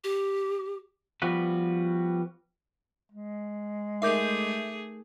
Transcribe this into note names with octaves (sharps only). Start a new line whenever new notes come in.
G4
F3 G3 B3 F#4 B4
G#3
A3 D#4 G#4 A#4 E5 D6 G6